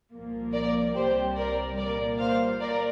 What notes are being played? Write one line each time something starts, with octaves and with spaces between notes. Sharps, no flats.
C2 A#2 F3 A#3
A#4 D5
C2 C3 G3 G4 C5
A#4 D5
A#2 G3 A#3 A#4 D5
C5 F5
A#3 A#4 D5